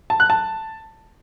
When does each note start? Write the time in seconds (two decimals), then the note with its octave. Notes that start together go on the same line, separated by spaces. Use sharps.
0.10 A5
0.20 F#6
0.30 A5